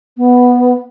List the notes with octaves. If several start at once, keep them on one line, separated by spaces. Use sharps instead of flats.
B3